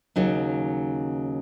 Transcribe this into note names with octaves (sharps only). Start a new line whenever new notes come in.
D#2 C#3 F#3 D#4